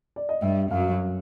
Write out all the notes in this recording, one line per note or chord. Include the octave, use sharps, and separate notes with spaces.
D5
D#5
G2 G3 E5
F#2 F#3 F5